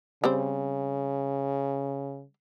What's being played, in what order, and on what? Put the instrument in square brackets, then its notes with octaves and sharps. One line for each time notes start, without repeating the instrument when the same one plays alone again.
[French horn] C#3 [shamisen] G3 C4 C5